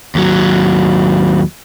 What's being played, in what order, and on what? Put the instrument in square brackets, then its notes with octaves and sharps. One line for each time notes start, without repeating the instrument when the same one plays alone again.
[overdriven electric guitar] D#2 F#3